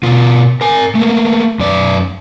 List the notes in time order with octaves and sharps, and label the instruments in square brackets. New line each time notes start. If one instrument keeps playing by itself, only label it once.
[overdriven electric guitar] B2 F4
A#4 G#5
A3 A#3
F#2 D5